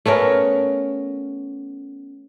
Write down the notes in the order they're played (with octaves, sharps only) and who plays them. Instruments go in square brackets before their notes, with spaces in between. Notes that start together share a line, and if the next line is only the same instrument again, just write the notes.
[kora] A3 B3 C#4 A#4